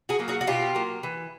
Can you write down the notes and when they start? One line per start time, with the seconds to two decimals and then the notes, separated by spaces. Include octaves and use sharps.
0.09 F#4 G#4
0.19 F#3 A#3
0.28 F#4 G#4
0.41 F#4
0.47 B2 F4 G4
0.75 F#3 A#3
1.03 E3